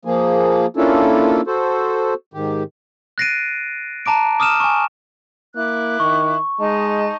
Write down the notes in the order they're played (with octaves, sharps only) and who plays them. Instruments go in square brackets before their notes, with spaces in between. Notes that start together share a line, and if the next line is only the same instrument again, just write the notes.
[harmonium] F3 A#3 G#4
A#3 C#4 D4 E4 F4 A4
F#4 A4 C5
G#2 D#3 G4
[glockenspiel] F#6 A6 A#6 C7 D7 D#7
A5 A#5 D6 D7
D6 D#6 F6 D#7 E7
G#5 C#6
[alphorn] A#3 [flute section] E4 D6 F#6
[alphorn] D#3 [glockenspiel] C#6
[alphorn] G#3 [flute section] D#4 D#5 A5